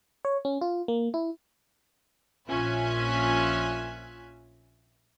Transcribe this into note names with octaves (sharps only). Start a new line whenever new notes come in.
C#5
C#4
F4
A#3
E4
A#1 C#4 F4 E5 G#5 F#6